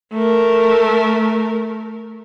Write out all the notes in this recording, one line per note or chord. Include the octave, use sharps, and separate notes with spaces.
A3 A#4